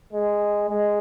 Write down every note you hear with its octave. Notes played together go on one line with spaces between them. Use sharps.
G#3
G#3